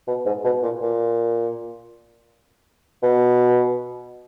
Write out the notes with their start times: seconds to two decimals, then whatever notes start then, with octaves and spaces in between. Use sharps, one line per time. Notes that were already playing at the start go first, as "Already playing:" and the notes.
0.07 B2
0.25 G#2
0.44 B2
0.63 A#2
0.81 A#2
3.02 B2